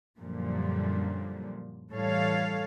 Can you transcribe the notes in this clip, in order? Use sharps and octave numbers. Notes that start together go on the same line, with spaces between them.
F#2 A#2 D3 F3 G3
A2 E3 G3 A4 C#5 F5